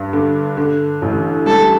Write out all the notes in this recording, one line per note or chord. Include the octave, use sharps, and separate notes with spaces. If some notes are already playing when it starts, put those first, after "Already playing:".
Already playing: G2
D3
D3
A1
G3 A4